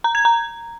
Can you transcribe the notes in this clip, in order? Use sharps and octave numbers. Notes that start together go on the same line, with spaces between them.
A#5
G#6
A#5